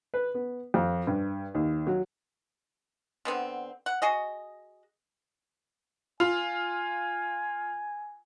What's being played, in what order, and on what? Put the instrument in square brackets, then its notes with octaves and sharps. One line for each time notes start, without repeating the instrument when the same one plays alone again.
[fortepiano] B4
B3
F2
G2
D#2
F#3
[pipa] D3 B3 C4
F#5
F#4 G#4 D#5
[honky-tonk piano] F4 [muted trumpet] G#5